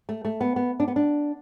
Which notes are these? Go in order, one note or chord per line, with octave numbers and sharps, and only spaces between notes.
A3
A3
B3
B3
D4
B3
D4